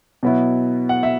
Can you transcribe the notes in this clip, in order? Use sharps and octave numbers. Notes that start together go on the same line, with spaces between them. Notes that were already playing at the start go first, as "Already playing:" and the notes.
B2 F#3 B3 E4
F#5
E5